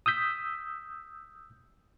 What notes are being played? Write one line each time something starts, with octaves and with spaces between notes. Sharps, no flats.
D#6 E6 G6 B6